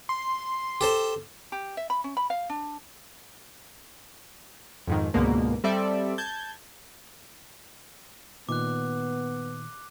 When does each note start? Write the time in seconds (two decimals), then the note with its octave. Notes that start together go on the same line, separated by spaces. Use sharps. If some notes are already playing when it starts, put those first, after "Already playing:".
0.09 C6
0.81 G4 A4 C5
1.52 G4
1.77 E5
1.90 B5
2.04 C#4
2.17 B5
2.30 F5
2.49 D4
4.87 F2 G#2 D#3
5.14 C#2 G#2 B2 D3 A#3
5.64 G3 C4 A4 D5 E5
6.18 A5 G6 G#6
8.49 A#2 D#3 B3 D6 F#6